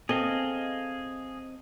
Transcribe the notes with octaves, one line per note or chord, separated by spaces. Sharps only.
C4 G#4 A4 D#5 F5